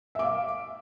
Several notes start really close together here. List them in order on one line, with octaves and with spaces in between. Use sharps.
E5 D6 F5